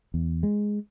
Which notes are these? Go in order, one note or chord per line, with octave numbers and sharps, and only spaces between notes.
E2
G#3